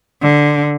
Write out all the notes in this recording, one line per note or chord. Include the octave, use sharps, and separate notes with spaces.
D3